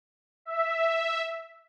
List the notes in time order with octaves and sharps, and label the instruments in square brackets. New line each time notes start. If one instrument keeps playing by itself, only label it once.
[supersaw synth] E5